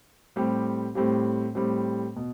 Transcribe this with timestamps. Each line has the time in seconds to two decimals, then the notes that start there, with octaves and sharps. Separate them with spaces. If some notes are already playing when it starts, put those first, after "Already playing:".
0.36 A2 G3 C4 G4
0.95 A2 G3 C4 G4
1.55 A2 G3 C4 G4
2.16 B2